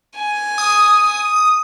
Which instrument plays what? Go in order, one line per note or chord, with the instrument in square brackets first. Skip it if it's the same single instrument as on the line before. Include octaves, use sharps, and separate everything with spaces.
[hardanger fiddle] G#5
[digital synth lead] D#6